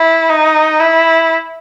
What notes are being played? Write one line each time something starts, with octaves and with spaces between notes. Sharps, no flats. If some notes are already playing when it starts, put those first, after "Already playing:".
Already playing: E4
D#4
E4